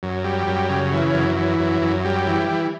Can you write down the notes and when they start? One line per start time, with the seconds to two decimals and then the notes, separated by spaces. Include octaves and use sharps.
0.03 F#2
0.24 G3
0.47 F#2
0.69 C#3
0.93 E3
1.14 F#2
1.37 E3
1.60 F#2
1.82 F#2
2.05 G3
2.27 E3
2.49 E3